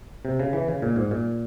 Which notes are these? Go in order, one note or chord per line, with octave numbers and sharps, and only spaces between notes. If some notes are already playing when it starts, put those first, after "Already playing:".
C3
C#3
E3
C#3
A#2
G#2
A#2